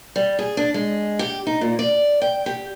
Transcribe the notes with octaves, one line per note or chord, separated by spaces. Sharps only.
G3
G#4
D4
G#3
G4
D#4
A#2
D5
G5
G4